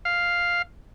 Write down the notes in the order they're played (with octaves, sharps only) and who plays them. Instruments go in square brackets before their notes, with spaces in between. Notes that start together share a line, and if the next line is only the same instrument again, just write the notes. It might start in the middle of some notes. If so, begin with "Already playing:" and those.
[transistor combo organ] F5